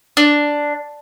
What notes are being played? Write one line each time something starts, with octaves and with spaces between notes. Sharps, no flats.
D4